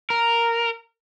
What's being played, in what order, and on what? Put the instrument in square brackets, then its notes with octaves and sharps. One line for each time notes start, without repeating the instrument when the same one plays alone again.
[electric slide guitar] A#4